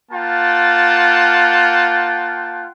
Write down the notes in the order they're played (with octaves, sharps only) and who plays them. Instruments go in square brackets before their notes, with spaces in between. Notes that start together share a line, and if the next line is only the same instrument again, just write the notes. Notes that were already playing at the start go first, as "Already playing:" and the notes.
[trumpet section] A#3 F4 F#5 G5 A5